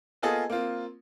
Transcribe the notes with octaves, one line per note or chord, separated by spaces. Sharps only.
A#3 B3 F4 G#4 A4 D#5
A#3 C4 F4